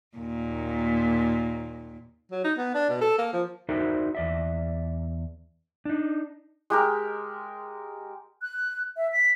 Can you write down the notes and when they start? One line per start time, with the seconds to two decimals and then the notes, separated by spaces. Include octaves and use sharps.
0.17 D#2 A#2
2.32 F#3
2.44 D#4
2.58 B3
2.75 D4
2.89 B2
3.01 A4
3.18 A#3
3.33 F3
3.69 D#4 F#4 A#4 C5 D5 E5
4.15 E2 D5 E5
5.85 D4 D#4
6.70 G#3 G4 A#4
8.42 F#6
8.97 E5
9.12 B6